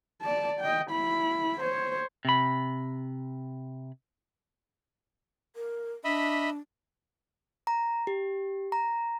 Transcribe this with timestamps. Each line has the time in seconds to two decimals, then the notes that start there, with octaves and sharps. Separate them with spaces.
0.22 D5 A5
0.61 D#5 G5
0.91 E4 B5
1.61 C5 C#5
2.25 C3 B5
5.54 A#4
6.04 D4 D#5 E5 B5
7.67 A#5
8.07 G4
8.72 A#5